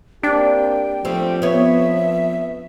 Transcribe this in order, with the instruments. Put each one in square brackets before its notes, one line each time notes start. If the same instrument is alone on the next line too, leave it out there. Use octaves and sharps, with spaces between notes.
[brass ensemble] A#3 C4 G4 [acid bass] D4 [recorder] G5
[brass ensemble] F3 [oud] G3 A3 C4
[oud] B3 C#5 [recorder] E5